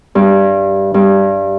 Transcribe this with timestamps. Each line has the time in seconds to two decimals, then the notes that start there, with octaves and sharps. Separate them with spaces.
0.15 G2
0.94 G2